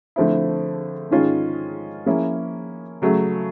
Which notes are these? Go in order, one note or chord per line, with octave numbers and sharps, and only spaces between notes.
D3 F3 A3 C4 E4
G#2 D#3 G#3 C#4 F4
F3 A#3 C#4 E4 G#4
C#3 F#3 A3